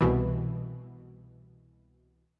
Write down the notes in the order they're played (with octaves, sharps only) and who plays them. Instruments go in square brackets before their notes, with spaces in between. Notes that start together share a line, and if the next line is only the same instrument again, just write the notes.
[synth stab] C2 B2 E3